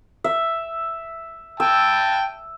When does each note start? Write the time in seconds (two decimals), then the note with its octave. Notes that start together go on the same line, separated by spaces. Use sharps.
0.24 E5
1.60 G5 A5 E6